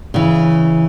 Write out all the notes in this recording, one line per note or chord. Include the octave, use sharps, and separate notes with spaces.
C#3 E3